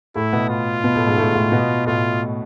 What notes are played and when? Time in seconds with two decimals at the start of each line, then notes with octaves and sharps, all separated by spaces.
0.15 A2 A3 E4
0.33 B2 B3
0.49 F4
0.84 B2 B3
0.95 A2 A3
1.07 G#2 G#3
1.18 A2 A3
1.35 A2 A3
1.52 B2 B3
1.86 A2 A3 F4